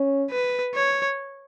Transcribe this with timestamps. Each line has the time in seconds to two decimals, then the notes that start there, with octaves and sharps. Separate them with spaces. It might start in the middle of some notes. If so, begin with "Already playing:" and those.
Already playing: C#4
0.31 B4
0.74 C#5